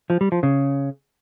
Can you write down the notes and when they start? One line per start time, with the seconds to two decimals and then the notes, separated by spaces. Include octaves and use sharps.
0.10 F3
0.21 G3
0.32 F3
0.43 C#3